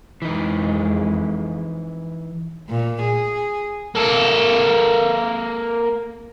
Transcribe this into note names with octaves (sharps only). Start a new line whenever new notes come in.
F2 E3 G#3 D#4
A#2
G#4
A#3 A4